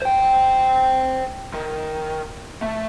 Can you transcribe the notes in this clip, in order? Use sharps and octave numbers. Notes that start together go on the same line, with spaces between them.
C5 G5
D#3
A3